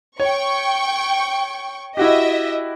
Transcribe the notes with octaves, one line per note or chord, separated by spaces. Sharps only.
C#5 G5 C#6
E4 F#4 G4 D#5 E5